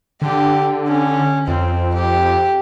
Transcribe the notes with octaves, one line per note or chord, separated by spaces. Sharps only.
D3 G4
C#4
F2 C4
G4